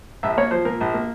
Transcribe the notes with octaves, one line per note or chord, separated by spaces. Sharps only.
A#1 E5
A#3 C#5
F3 C5
A#2 A#4
A#1
A#3